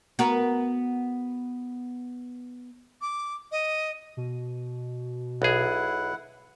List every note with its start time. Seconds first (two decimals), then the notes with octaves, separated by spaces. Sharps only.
0.19 B3 F#4 A#4
3.01 D6
3.52 D#5
4.17 B2
5.42 B1 E4 G#4 F#5